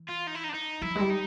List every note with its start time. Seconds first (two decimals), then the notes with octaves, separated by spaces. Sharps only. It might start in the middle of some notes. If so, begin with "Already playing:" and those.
Already playing: E3
0.08 F4
0.27 D#4
0.35 E4
0.43 D#4
0.49 D4
0.54 D#4
0.82 F3 E4
0.96 G#3
1.00 G3
1.10 D#4